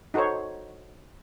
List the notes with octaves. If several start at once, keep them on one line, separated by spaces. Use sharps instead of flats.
D#4 F#4 A4 C5 C#5